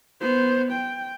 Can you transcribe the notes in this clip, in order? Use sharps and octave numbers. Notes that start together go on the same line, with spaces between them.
B3 C5
G5